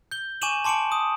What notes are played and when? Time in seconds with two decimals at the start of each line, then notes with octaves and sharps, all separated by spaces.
0.11 G6 G7
0.41 G#5 C#6 D6 D#7 E7 F#7
0.64 A5 C6 D6 C#7 D7 F#7
0.92 D#6